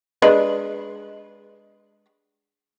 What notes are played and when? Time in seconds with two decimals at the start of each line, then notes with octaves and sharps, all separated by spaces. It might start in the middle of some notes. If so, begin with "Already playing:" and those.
0.22 G#3 D4 B4